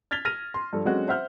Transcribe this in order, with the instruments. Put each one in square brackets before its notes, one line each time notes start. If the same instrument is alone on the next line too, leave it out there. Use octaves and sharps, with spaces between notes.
[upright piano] F6 G#6 A6 B6 F7 G7
F6 A#6 D#7 F7
C6
G2 F3 A4
D3 F#3 G#3 C4 C#4 F#4
C5 E5 F#5 F6 G6